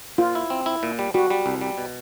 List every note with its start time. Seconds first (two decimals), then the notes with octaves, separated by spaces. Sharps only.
0.18 A#2 F4
0.35 E4
0.50 C4
0.66 E4
0.83 A#2
0.99 G3
1.14 G3 F#4
1.30 G3
1.46 C2
1.61 G3
1.78 B2